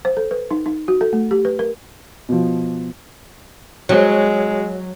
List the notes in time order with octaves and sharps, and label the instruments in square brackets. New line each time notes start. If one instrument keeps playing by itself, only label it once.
[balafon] C5
A4
B4
D#4
D#4
F#4
A4
A3
G4
B4
A#4
[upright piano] B2 F3
[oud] F#3 [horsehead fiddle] G#3